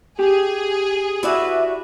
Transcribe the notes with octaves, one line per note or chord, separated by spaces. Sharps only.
G4 G#4
E4 F#4 B4 D5 E5